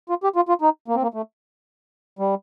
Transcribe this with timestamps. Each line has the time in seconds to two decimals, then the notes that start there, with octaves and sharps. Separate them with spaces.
0.09 F4
0.24 G4
0.36 F4
0.49 F4
0.62 D#4
0.88 A#3
0.95 C4
1.03 A#3
1.14 A3
2.19 G3